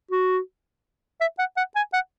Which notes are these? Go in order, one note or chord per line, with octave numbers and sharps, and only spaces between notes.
F#4
E5
F#5
F#5
G#5
F#5